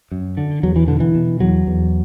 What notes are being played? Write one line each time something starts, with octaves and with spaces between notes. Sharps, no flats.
F#2
D3
E2 F#3
E3
B2 D3
E3
B2
E2 F#3
E2